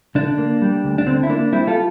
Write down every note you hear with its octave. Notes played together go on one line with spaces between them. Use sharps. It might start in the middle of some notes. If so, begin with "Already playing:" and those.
D3 D4
A#3
G3
D2
D4
D3 C4
E4
A#3 D4
G3 C4 E4
F4 A4